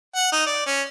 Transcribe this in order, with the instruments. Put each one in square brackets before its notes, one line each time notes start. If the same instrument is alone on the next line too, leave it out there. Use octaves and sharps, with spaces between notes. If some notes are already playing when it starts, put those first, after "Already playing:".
[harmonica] F#5
D#4
D5
C#4